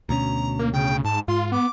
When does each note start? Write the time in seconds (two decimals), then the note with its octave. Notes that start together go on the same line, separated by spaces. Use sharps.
0.09 D2 B2 C#4 A#5
0.59 A#3
0.73 C#3 G5
1.04 G#2 A5
1.28 G#2 F4 C6
1.52 B3 D6